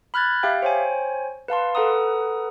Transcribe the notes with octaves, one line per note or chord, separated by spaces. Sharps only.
B5 F6 F#6 G#6 A6
G4 E5 F5 G5
C5 C#5 G5 G#5
B4 F5 A5 C6
A4 B4 F#5 A#5 D#6